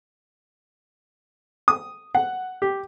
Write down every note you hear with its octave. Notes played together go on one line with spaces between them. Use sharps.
D#6
F#5
G4